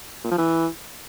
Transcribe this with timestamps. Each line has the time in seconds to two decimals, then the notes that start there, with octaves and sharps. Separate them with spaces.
0.24 A#2
0.31 F3
0.38 E3